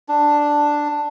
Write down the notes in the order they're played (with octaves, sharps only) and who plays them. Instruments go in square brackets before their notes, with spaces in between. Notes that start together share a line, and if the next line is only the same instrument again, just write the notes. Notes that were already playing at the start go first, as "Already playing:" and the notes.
[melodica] D4